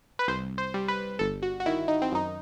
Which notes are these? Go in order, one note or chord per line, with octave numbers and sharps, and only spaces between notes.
B4
C2 C5
C5
G3
B4
G1 A4
F#4
F#4
D#3 E4
D#4
C4
F#2 D#4